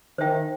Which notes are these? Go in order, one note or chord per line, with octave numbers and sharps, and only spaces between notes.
D#3 C5 E5 G5